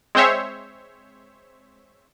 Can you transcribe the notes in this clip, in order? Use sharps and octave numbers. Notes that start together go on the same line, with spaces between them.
G#3 C4 C5 C#5 E5